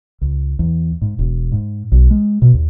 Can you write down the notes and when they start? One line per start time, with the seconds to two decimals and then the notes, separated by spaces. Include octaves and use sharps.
0.21 C#2
0.59 E2
1.02 G#2
1.19 E1
1.52 G#2
1.92 B1
2.11 G#3
2.42 B2
2.54 D#2